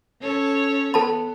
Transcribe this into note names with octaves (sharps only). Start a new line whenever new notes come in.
C#4 A4 C#5
B3 A4 A5 B5